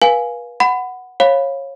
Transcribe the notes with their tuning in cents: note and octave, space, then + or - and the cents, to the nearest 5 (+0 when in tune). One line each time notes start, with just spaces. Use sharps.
B4 -35 F5 +0 G#5 +5
F#5 +0 B5 +20
C#5 -20 F5 +0 B5 +0